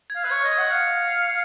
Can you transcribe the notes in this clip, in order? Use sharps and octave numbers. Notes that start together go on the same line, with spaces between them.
G#6
F5
B4
C#5 G#6
D#5
G#6
F#5
F5 C#7